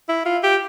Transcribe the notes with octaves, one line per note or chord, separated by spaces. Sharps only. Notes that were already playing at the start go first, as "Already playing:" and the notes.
E4
F4
G4